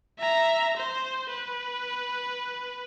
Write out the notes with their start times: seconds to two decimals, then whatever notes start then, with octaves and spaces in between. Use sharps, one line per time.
0.19 E5 A#5
0.77 C5
1.30 B4